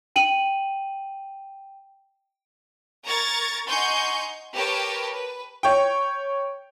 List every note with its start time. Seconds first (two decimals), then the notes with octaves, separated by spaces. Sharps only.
0.16 G5 D#7 F#7
3.05 A#4 A#5 C#6 G#6 A6
3.68 D#4 F#5 G#5 C6 C#6 G6
4.54 G4 A#4 B4 C#5 G5 A5
5.13 B4
5.63 C#5 G5